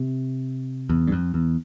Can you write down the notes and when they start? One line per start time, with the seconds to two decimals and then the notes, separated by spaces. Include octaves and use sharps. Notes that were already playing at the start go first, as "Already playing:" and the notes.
Already playing: C3
0.89 E2
1.07 G2
1.12 F2
1.34 E2